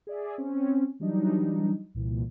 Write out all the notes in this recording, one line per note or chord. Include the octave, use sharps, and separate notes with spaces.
G#4 D5 E5
C4 C#4
E3 F#3 G3 D4 D#4
C2 A#2 E3